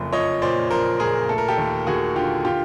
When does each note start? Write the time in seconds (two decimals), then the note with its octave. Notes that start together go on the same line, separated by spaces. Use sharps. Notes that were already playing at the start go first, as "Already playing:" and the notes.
Already playing: F#1 F2
0.13 F3 C#5 D#5
0.42 A#2 C5 D5
0.70 F3 A#4 C5
1.00 A#2 G#4 A#4
1.29 A3 A4
1.38 A#4
1.48 G4 A4
1.58 D#2
1.87 D#2 F#4 G#4
2.16 D3 F4 G4
2.45 F4 G4